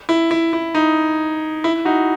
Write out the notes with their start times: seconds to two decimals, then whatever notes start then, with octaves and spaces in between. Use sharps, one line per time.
0.09 E4
0.31 E4
0.53 E4
0.75 D#4
1.64 E4
1.85 D#4 F#4